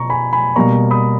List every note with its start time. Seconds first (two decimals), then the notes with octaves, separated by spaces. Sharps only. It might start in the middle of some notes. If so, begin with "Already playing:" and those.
Already playing: B2 A#5 C#6
0.10 G#5 B5
0.33 G#5 B5
0.56 B2 G3 A#3 A#5 C#6
0.91 B5 D#6